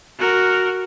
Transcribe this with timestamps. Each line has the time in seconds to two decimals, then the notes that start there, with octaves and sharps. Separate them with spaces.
0.20 F#4 A#4